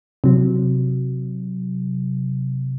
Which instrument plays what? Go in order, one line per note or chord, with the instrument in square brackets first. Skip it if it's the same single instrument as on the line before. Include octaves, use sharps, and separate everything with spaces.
[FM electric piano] C3 F#3